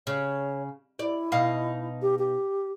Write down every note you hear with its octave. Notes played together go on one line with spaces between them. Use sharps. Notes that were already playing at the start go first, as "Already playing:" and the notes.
C#3 C#5
E4 D5
B2 D#4 F5
G4
G4